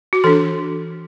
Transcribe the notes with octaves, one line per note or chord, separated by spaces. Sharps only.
F#4
E3 D4 A4